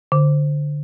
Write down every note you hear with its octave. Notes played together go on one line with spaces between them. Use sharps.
D3